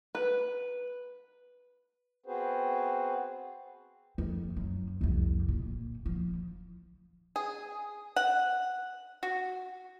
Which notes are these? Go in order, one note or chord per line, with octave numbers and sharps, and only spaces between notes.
B4
B3 C4 F#4 G#4 B4 C5
F2
F#2
C2 F2
A#2
F3
G#4
F#5
F#4